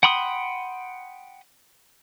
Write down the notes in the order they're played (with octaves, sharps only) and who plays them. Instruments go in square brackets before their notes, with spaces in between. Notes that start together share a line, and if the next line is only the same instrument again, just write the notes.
[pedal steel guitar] F#5 G5 B5 C6 D#6